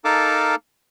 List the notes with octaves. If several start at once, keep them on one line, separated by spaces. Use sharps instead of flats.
D#4 A4 A#4 F5 A5 D6